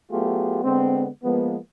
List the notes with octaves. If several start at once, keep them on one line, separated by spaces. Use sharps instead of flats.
F#3 A3 B3 F4 G4 G#4
D3 G#3 B3 C4
F3 G#3 A#3 B3